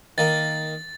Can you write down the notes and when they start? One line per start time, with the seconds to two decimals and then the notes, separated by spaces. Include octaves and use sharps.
0.18 D#3 A#3 A6